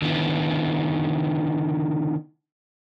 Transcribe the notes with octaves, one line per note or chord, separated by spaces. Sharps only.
D3 D#3 B3 E4